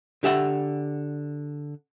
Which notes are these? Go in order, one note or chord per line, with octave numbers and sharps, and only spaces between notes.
D3 G4 E5 F#5